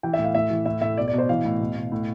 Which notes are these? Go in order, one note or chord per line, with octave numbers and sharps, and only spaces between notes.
E3 G5
E5
A2
F5
A2 E5
E3
A2 E5
A2 E5
B2 D5
D5
B2
C5
E3 F5
A2
B2
B2
A2